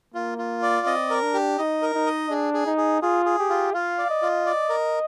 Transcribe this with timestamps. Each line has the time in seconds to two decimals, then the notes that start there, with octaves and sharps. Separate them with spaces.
0.14 A#3 F4
0.38 F4
0.62 D5
0.86 C4 D#5
1.10 A#4
1.22 D4
1.34 G4
1.58 D#4 D#5
1.82 A#4
1.94 D#4
2.06 D#5
2.30 D4 G#4
2.54 G#4
2.66 D#4
2.78 G#4
3.02 F4 G#4
3.26 G#4
3.39 G4
3.49 F4
3.74 F4 F5
3.98 D5
4.10 D#5
4.22 F4
4.46 D5
4.69 A#4